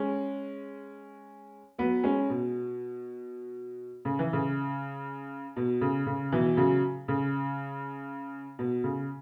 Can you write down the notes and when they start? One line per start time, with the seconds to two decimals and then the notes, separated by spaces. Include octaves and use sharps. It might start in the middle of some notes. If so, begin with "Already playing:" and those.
Already playing: G#3 C#4
1.78 F#3 B3
2.04 G#3 C#4
2.29 B2
4.05 C#3
4.19 E3
4.33 C#3
5.56 B2
5.81 C#3
6.06 C#3
6.32 B2 E3
6.57 C#3 F#3
7.08 C#3
8.59 B2
8.84 C#3